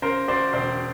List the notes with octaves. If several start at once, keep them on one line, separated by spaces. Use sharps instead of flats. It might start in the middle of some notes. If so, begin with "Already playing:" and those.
C#3 A#4 C5
D2 C5 D5
E1 C5 D5